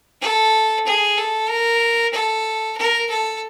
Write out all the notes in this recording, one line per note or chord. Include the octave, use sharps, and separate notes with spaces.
A4
G#4
A4
A#4
A4
A#4
A4